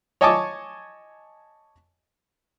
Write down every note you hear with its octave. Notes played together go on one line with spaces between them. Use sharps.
C#5 D#5 G#5 A5 C#6 D6